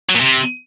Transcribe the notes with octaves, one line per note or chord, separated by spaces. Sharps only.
F#3
A#2
C3